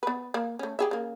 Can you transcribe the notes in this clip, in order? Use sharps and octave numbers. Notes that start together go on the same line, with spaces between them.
B3 B4
A#3
A3 C#4
G4 G#4 E5
C#3 A#3